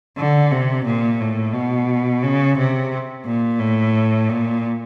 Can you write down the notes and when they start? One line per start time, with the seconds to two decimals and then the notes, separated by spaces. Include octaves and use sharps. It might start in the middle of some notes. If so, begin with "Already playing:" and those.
0.17 D3
0.51 C3
0.85 A#2
1.20 A2
1.54 B2
2.23 C#3
2.58 C3
3.25 A#2
3.60 A2
4.29 A#2